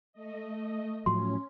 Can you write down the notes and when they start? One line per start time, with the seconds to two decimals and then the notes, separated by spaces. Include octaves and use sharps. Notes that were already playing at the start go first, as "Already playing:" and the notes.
0.13 A3 D#5
1.06 A2 F3 F#3 C#4 C6